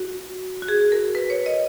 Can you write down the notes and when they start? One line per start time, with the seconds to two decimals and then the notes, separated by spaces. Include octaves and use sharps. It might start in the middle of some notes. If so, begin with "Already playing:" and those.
Already playing: F#4
0.62 F#4
0.68 G#4
0.92 A#4
1.15 B4
1.30 C#5
1.46 D#5